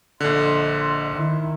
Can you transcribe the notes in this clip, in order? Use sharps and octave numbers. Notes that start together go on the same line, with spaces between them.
A#1 D3 D#5 C6
D#3 E4